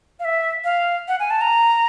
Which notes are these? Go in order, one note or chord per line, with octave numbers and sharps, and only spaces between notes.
F5
E5
F5
F#5
G#5
A5
A#5